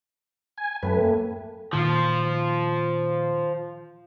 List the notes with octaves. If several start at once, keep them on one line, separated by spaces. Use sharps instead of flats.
G#5
F#2 A2 G4 B4 A5
A#3
A#2 D#3 F3 F4